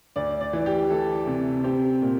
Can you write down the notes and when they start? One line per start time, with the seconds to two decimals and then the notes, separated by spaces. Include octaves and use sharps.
0.16 D2 D5
0.40 D5
0.53 E3
0.66 G4
0.90 E3 A4
1.27 C3
1.64 C4 G4
2.02 A#2